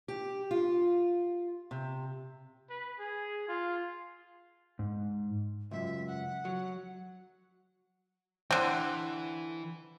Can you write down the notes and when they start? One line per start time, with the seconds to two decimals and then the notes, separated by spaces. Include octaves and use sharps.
0.08 G4
0.51 F4
1.71 C3
2.70 B4
2.99 G#4
3.48 F4
4.79 G#2
5.71 C#2 F#2 E5
6.07 F#5
6.45 F#3
8.51 D3 E3 C4